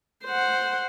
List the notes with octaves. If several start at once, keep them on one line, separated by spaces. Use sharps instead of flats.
C5 F#5